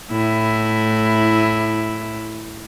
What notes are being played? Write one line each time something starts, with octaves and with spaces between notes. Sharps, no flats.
A2 E4